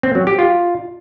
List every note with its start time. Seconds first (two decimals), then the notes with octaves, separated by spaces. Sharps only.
0.03 C4
0.15 F#3
0.27 G4
0.39 F4